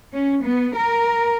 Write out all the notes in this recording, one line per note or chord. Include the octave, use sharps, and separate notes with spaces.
C#4
B3
A#4